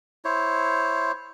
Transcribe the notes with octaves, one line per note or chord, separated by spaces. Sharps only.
E4 C5 C#5